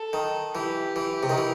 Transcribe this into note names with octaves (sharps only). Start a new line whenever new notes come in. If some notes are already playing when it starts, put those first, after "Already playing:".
Already playing: A4
D#3
E3 G4
E3
C3
D#3
E3